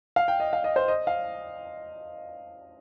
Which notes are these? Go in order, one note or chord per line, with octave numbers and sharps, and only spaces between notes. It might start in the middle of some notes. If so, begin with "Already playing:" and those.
F5
G5
D#5
F5
D#5
C5
D#5
F5